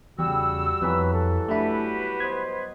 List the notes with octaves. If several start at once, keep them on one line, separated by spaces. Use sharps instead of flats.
E2 C#3 G3 F#4 E6
F2 E3 F#3 B3 B4
A4
A3 D4 E4 F#4 G4 B4
B3 C5 D#5 G#6